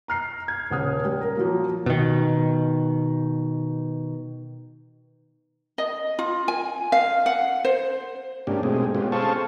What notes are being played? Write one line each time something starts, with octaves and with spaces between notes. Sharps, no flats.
A#5 F6 C7
G#6
D#1 C#3 F#5 D#6 F6
G3
A#4
F3 F#3 A#3
B2 D#3
D#5
F4
G#5
F5
F#5
C5
G#2 A#3 C#4 D4 G4
B2 G#3 A3 C4 G#4
G#3 B3 C#4 F4 G4
G#4 A4 C5 F5 A5 C#6